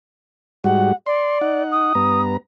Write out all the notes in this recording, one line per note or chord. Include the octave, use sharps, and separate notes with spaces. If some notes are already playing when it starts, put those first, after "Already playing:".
G#2 G3 F#4 F#5
D5 C6
D#4 F#5
D#6
G2 B3 A#5